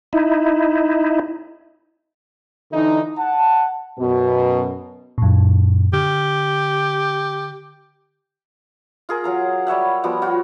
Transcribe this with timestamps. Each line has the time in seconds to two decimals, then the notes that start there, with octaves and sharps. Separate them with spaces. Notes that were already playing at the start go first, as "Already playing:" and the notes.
0.13 D#4 E4
2.73 D3 E3 D#4
3.18 F#5 A5
3.99 F#2 B2
5.18 F#2 A#2
5.93 D3 G4
9.09 F4 G#4 A#4
9.24 F#3 F5 A#5
9.67 G3 C#5 E5 F#5
10.03 F3 G3 B3 F#4
10.22 F4 F#4